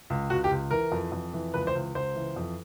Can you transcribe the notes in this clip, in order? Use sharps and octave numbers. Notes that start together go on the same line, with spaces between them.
C#2
C#2 F#4
G4
C#2
E3 A#4
F2
F2
E3
C#2 B4
C5
C#2
C#2 C5
E3
F2